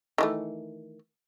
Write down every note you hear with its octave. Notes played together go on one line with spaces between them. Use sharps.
D#3 E3 A3